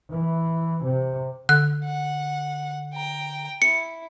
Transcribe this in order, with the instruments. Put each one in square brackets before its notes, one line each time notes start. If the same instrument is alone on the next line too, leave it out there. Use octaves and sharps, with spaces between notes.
[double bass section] E3
C3
[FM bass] D3 [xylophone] F#6
[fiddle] F#5
G5 A#5
[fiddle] E4 [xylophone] C#7